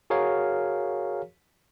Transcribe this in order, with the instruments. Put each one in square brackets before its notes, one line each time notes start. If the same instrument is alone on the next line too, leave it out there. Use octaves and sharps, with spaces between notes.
[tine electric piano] F#4 G#4 A#4 C#5 F5